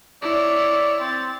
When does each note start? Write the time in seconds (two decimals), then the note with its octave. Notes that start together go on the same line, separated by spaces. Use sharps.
0.23 E4 C#5 D5
1.00 C4 A6